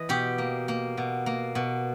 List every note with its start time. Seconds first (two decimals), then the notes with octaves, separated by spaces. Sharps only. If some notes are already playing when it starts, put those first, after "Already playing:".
Already playing: E3 D#5
0.09 B2 G4
0.38 A#3
0.68 A#3
0.97 B2
1.26 A#3
1.55 B2